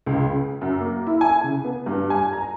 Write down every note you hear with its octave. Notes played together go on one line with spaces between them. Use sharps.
C#2
C#3
F#2
A#3
E4
G#5
C#3
B3
G2
G#5
A#5